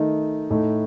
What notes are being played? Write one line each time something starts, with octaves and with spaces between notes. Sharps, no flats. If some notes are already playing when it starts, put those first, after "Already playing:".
Already playing: D#3 A3 D#4
A2 A3 D#4